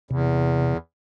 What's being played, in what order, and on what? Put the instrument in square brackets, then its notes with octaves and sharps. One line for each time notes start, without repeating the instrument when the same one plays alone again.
[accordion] E2 [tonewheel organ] C3